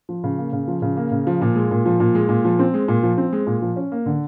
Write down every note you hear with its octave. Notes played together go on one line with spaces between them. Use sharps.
F3
C#3
A#3
C#3
F3
C#3
A#3
C#3
F3
A#2
G#3
A#2
F3
A#2
G#3
A#2
F3
C4
G#3
A#2
F3
C4
G#3
A#2
F3
C#4
A#3
D3